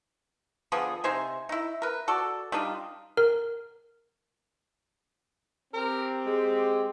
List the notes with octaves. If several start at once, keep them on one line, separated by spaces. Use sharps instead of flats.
D3 F3 B3 G#4
C3 D#4 C5 G#5
D#4 E4
A#4 B4
F#4 A4 D5
G3 D4 D#4 F4
A#4
C4 G4 A#4
G#3